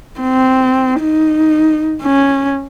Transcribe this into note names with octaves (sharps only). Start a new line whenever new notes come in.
C4
D#4
C#4